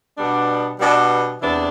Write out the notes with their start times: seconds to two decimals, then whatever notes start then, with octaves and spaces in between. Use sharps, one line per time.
0.18 B2 G3 B3 D4
0.79 B2 G3 B3 D4
1.42 E2 C3 E3 B3 D4